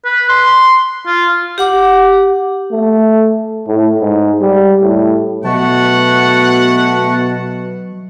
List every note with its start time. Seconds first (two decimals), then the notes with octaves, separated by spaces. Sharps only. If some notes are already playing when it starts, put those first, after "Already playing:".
0.05 B4
0.29 C6
1.06 F4
1.58 G4 F#5 D6
2.71 A3
3.67 A2
4.01 G#2
4.41 G3
4.83 A2
5.44 B2 F#3 A3 F#4 F#5 A5